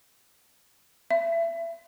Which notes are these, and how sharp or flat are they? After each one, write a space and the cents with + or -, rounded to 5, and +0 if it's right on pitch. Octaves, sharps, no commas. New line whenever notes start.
E5 +30